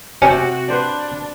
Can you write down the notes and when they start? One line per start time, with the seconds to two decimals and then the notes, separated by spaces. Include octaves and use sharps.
0.22 C3 C#4 F#4 G5
0.68 D4 B4 C5 D5